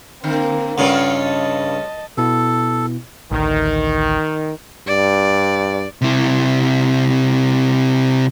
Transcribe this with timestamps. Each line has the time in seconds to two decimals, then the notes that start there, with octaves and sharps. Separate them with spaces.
0.24 D3 A#3 C4
0.78 G2 C#3 C#4 F4 A4 F#5
1.16 D#5 A5
2.17 B2 B3 E4 A4
3.31 A1 D2 D#3
4.87 G2 D5
6.02 C3 E4